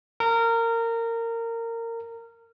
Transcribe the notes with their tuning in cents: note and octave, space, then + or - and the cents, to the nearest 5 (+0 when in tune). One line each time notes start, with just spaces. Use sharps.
A#4 -20